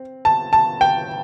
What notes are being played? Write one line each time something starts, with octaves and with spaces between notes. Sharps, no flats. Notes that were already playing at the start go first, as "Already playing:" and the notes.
Already playing: C4
A5
A5
G5